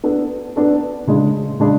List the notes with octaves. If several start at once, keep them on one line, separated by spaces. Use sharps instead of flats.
B3 D4 A4
B3 D4 A4
C#3 G#3 D4
C#3 G#3 D4